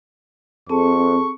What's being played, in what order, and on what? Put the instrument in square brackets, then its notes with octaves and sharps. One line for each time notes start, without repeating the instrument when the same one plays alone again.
[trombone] F2 [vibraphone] C4 [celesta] G#4 A4 A5 [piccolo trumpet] C#6